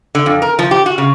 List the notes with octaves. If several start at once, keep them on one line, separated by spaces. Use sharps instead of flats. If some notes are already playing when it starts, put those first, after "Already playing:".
D3
F2
A#4
F3
G4
F#4
C#3